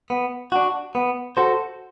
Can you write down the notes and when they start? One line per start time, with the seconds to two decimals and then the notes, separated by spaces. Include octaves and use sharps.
0.10 B3
0.52 D4 F#4
0.95 B3
1.37 F#4 A4 C5